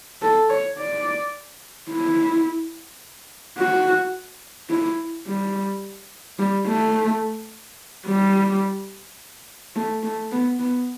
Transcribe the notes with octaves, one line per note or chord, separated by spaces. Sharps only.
A4
C#5
D5
E4
F#4
E4
G3
G3
A3
G3
A3
A3
B3
B3